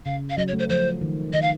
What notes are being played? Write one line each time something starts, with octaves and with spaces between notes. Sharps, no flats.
C#3 F5
F5
F#3 D#5
C#5
A3
C5
F3 C5
D#3
D#3 D#5
F5